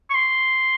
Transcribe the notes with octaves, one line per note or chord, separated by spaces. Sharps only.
C#6
C6